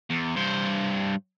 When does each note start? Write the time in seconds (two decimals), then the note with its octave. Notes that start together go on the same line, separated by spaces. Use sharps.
0.10 E2
0.36 G2 C5